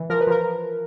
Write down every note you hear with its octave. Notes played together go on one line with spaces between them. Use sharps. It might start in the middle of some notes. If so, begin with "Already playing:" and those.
Already playing: E3
F3 A#4
B4
F3 A#4